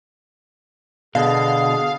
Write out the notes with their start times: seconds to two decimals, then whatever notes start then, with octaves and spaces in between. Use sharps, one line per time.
1.15 B2 D3 G#4 F5